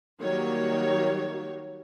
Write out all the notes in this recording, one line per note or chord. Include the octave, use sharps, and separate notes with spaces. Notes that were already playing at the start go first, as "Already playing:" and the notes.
D#3 F#3 G3 A#3 C#5